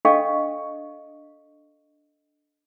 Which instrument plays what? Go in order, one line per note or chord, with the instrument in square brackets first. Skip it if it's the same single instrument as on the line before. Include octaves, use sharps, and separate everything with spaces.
[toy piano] D4 A4 D#5 F5 G5 C#6